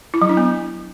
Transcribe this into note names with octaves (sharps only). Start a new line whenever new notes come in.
E4
F#3
D4
B3